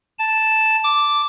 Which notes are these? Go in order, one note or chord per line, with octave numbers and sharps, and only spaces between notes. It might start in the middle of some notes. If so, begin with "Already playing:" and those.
A5
D6